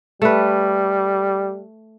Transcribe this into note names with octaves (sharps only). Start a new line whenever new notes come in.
G3 A3 B4